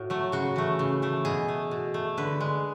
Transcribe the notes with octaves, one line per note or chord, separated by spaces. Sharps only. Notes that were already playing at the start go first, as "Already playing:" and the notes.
Already playing: A2 F#4
F#3 A3
C#3 F#4
E3 A3
C#3
E3 A3
B2 G#4
A3
B2
A3
D3 B4
G#3